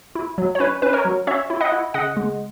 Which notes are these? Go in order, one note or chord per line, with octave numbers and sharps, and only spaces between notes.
E4
F#3
C#5
C#4 B4
C#4 B4
A#4 C#5
F#3
C#4 C#5 E5
E4
D#5 F#5
E4
C#3 D#5 F#5
G#3